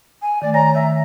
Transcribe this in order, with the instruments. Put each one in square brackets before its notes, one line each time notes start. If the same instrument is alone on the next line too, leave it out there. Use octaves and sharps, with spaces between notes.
[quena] G#5
[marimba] D#3 A3 [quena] D5
[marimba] C#5 G#5 A#6 [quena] A#5
[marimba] D#3 [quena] E5